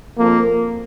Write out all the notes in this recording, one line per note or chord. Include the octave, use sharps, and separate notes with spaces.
F2 F3 A#3